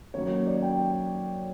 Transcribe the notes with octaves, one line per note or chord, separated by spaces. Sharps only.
F#2 D#3 F#3 A#3 C#5
D5
G5